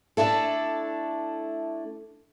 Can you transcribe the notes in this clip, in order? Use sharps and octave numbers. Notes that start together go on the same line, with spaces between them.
A3 D4 E4 A4